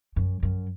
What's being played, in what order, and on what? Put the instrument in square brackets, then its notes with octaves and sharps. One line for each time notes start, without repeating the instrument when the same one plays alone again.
[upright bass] F#2
F#2